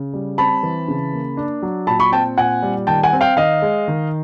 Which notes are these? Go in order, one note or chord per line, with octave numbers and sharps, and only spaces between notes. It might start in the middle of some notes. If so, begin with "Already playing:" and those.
Already playing: C#3
G3
C4 A5 B5
E3
C#3
A#3
D4
F#3
A#2 A5 B5
B5 C#6
C4 G5 A5
A#2 F#5 G#5
G3
D#3 G5 A5
F#5 G#5
C4
F5 G5
D#3 D#5 F5
G#3
D#3